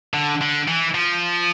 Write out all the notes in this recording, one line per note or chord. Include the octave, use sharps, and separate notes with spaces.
D3
D3
E3
F3